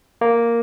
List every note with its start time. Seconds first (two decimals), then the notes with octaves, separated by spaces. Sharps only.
0.21 A#3